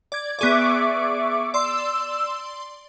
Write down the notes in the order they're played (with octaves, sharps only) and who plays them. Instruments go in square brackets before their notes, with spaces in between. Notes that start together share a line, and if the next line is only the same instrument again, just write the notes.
[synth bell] D5 G#6
[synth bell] B3 G#4 D5 [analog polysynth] E5 C#6 D6
[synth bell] D5 C6 [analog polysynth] E6